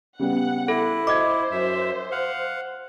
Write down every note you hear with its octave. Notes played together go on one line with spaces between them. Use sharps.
C#3 G3 B3 F#5
E4 A4
C5 D#5 D6 G#6
F#2 E5
F5 F#5